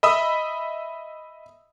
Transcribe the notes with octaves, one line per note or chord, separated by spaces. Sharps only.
D#5 E5 B5 D#6 E6